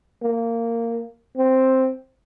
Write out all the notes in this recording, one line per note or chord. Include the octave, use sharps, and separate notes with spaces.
A#3
C4